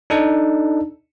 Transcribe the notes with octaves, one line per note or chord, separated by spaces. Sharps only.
D4 D#4 A4